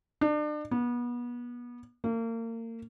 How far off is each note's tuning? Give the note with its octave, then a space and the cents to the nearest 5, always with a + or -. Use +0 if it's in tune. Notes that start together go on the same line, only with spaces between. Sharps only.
D4 +35
B3 -30
A#3 -35